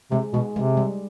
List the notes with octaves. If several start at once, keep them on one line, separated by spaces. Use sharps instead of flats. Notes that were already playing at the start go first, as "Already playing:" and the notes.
C3 G#3
B2 G#3
C3 G#3
G3